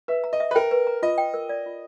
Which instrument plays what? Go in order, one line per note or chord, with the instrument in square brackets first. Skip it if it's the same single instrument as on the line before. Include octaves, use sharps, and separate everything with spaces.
[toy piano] B4 [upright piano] E5
[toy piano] A#5
[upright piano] D#5
[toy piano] E5
[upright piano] B4
[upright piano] A#4 [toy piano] G5
[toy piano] B4
A#5
[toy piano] F4 [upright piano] D#5
[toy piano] G5
A#4
D5
F4